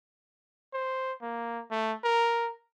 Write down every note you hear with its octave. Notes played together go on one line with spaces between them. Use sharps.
C5
A#3
A3
A#4